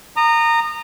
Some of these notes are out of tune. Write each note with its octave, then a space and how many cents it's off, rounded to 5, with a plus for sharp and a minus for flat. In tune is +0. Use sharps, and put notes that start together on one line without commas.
A#5 -15 D#6 -30